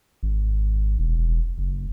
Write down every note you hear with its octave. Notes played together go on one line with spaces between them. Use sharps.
G#1
E1
F#1